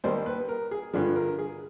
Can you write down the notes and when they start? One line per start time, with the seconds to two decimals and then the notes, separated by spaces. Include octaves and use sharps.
0.04 D#2 D#3 G3 C5
0.26 B4
0.49 A#4
0.71 G#4
0.93 G2 D3 F3 G#4
1.16 A#4
1.39 G#4